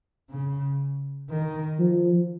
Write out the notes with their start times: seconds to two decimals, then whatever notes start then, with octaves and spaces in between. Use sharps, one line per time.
0.30 C#3
1.30 D#3
1.80 F3